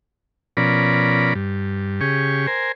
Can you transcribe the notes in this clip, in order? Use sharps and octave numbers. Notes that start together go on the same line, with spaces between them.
B2 F3 C#4 A#4 D5 B5
G2
C#3 G4 G#4 C#6
A#4 C5 G#5